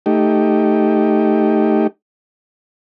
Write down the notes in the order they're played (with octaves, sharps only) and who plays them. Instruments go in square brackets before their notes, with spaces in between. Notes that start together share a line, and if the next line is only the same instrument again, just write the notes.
[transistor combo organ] A3 D#4 G4